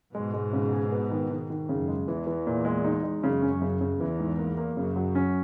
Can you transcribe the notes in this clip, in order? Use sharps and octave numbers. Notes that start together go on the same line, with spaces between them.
G#2 B2 G#3
G#3
C#3
G#4
B3
D#3
D#3
D#3
F#2 C#3
G#3
E2 E3
E3
A#2
G#3
D#4
G#3
F#2 C#3
C#4
C#3
C#3
E2 E3
G#2
A#3
A#3
F#2 C#3
F#3
C#4